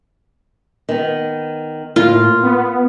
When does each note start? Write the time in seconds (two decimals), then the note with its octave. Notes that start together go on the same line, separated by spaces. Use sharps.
0.89 D#3 B3
1.96 A2 A#3 F4
2.43 B3